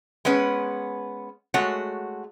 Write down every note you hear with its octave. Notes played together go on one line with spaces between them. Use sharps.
G#3 B3 C#4 B4
G#3 A3 F#4 C#5 F#5